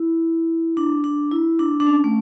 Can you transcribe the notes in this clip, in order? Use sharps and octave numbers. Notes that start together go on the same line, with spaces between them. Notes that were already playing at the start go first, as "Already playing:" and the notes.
Already playing: E4
D4
D4
E4
D4
D4
C#4
A3